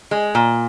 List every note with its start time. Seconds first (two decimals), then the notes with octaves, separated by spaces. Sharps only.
0.11 G#3
0.35 A#2